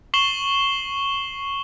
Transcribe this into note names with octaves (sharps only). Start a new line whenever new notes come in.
C#6 C7 E7 F#7 G7